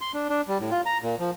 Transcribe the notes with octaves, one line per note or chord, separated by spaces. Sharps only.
C6
D4
D4
G3
A2
F4
A#5
A#2
F3